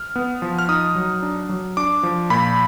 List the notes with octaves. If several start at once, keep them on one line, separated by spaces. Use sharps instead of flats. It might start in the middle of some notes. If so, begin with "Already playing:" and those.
Already playing: F6
B3
F3
F6
D#4 D#6
F#3
D4
F#3
D4 D6
F3
A#2 B5